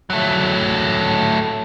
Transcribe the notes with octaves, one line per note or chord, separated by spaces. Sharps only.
F#3 A3